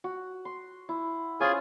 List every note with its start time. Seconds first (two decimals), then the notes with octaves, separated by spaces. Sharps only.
0.04 F#4
0.45 C6
0.89 E4
1.41 C#4 F4 G#4 C5 G#5